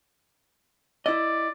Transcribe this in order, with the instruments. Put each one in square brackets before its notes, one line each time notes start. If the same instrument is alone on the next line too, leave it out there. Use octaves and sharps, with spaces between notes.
[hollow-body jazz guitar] E4 D#5 [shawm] D5